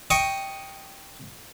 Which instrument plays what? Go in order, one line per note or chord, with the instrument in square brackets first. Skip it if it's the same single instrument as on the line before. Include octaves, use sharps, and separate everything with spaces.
[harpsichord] D#5 G5 C#6 D#6